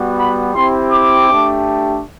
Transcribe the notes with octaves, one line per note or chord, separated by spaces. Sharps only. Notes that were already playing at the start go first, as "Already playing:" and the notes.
Already playing: G3 B3 F#4
B5
C4 E4 G4 C6
D6
A3 D4 G4